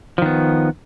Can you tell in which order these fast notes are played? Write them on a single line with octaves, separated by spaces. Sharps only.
F3 D#3 B3